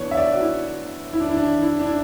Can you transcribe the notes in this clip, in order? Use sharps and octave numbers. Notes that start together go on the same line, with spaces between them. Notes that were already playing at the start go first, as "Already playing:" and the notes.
Already playing: E3 B3 D4 B4 C#5
E5
D5
F#4
E4
E4
D4
E4
D4
E4
D4
E4